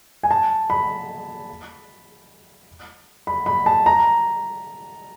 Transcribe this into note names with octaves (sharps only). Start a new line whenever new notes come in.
G#5
A5
B5
B5
B5
A5
A#5